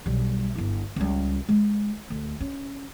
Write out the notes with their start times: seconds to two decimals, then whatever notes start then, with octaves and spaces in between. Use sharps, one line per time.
0.06 B1 G3
0.55 G1 E4
0.96 C#2 G3
1.49 G#3
2.10 D2
2.40 C#4